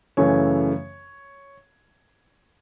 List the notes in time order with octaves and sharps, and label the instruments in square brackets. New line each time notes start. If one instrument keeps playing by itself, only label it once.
[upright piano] F#2 C#3 E3 A3 C#5